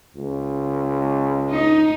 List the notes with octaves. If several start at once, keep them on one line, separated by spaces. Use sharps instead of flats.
C#2
D#4